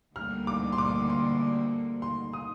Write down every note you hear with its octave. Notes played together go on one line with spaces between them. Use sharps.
D2 D3 G3 A#3 F6
D6
C6
D6
C6
C6
D#6